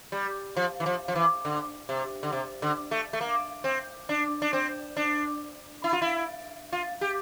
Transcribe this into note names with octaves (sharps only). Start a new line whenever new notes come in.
G3
F3
E3
F3
F3
E3
D3
C3
D3
C3
D3
A3
A3
A#3
C4
D4
D4
C4
D4
E4
F4
E4
F4
G4